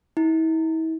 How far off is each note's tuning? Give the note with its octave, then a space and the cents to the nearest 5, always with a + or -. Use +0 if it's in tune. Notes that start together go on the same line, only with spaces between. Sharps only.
E4 -40